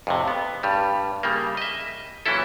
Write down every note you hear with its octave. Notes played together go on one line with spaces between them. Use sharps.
F2 A2 C3
B3
G2 G3
C#3 G3 A#3
D#5 E5
A#2 E3 F#3 C#4 E4 A4